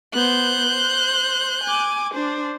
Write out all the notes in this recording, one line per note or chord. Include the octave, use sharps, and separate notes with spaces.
B3 C5 F#6 G6
C5
G#5 D6
D4 C5